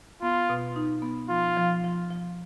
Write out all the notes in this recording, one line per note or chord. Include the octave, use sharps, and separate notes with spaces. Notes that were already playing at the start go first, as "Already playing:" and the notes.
B3 F4
B2
D#4
B3
F3 F4
F3
F3
F3